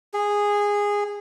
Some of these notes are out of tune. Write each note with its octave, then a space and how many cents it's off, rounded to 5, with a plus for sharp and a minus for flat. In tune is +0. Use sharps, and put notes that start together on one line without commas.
G#4 -15